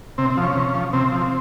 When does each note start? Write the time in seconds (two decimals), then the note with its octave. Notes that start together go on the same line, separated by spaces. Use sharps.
0.18 C3 C4
0.30 C4
0.37 F3
0.43 C#4
0.55 C3
0.75 F3
0.93 C3 C4
1.12 F3